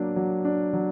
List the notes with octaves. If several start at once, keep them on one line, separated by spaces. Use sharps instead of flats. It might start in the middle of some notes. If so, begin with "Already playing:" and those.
Already playing: F#3 A#3 D4
F#3
D4
F#3